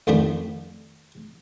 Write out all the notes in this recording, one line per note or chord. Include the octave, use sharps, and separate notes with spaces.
A1 F2 D#3 A3 D4 B5